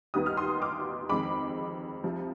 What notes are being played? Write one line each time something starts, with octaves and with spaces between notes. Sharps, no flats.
D#2 D#3 G3 B3 D#6
F6
C6 D#6
D6 F6
F2 D#3 G#3 B5 D6
C2 C3 F3